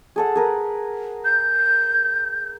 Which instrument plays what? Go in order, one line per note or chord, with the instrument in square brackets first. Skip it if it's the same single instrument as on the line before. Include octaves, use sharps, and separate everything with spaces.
[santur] G#4 A4 F#5
G#4 A#4 B4
[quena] G6